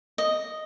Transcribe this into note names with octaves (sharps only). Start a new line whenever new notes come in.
D#5